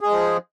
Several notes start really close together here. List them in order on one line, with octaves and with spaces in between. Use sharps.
G#4 G#3 F3